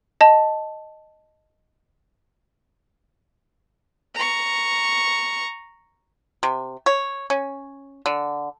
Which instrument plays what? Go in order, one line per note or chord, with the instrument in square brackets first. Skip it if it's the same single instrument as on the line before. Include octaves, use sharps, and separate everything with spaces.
[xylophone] D#5 A5
[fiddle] A#5 C#6
[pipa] C3
C#5
C#4
D3